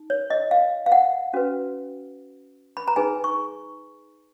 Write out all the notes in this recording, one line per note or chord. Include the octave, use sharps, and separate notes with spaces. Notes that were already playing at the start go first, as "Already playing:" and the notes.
Already playing: D#4
C#5
D#5
F5
F5
F#5
C#4 F#4 B4
B5
A#5
D#4 G#4 B4 G#5
C#6